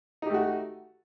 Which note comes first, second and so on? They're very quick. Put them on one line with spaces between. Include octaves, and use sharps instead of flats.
D#4 G4 A3 F#4